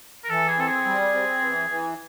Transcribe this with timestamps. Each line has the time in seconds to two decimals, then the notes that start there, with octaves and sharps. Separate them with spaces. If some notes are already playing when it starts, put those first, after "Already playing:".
0.24 A#4
0.29 E3 A4
0.48 G#4
0.58 C4 A4
0.67 G#4
0.86 G3
1.14 C4
1.42 E3
1.70 E3